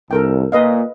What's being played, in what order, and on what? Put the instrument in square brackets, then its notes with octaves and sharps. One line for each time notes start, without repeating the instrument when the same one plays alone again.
[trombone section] C2 [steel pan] A4 A#4 G5
[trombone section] A#2 [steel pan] B4 D#5 F5